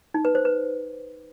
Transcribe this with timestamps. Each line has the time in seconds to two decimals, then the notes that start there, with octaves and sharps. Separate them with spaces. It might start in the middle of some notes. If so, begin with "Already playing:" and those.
0.14 D#4
0.25 B4
0.35 C5
0.45 B4